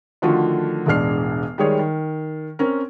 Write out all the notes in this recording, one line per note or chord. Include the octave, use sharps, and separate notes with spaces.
D3 D#3 F3 A3 F4 F#4
E1 A1 G#3 D4 F6 C7
D#3 G3 G#3 G#4 C#5 D5
D#3
C4 C#4 A#4